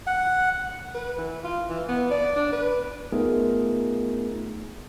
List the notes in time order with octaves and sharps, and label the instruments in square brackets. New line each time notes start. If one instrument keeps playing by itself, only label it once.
[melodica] F#5
[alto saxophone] B4
E3
F4
E3
B3
D5
D4
B4
[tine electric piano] A3 B3 D#4 F4 G#4 A#4